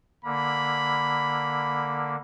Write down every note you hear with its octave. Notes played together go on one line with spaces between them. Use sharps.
D3 A#3 B5